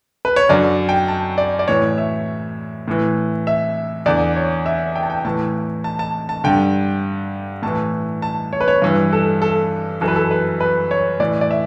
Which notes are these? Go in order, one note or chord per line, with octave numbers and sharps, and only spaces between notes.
B4
C#5
F#2 D3 D5
G5
A5
D5
D5
A2 E3 C#5
E5
A2 E3
E5
E2 D3 D5
C#5
E5
G5
A5
G5
A2 E3 A5
A5
A5
A5
G2 D3 G5
A2 E3 A5
A5
C#5
B4
C#5
G2 E3
A4
A4
F#2 E3 A4
B4
A4
B4
B4
C#5
A2 E3 D5
D5
E5